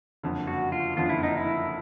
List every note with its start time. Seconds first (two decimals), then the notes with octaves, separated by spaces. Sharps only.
0.23 F#1 F2 D3
0.47 F#4
0.72 F4
0.96 F#1 F2 D3 F4
1.09 E4
1.23 D#4
1.37 E4